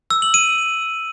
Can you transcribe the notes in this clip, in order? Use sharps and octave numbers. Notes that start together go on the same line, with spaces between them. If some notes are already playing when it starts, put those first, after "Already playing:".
E6
F#7
D#7